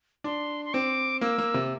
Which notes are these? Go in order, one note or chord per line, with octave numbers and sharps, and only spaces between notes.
D4 C6
C6
C4 D6
A#3 E6
A#3
C3